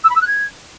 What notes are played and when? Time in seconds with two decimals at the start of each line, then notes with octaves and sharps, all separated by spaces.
0.04 E6
0.10 B5
0.15 E6
0.21 F#6
0.27 G#6